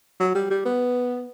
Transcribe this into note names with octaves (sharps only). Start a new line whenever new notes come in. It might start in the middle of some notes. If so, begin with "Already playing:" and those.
F#3
G3
G3
B3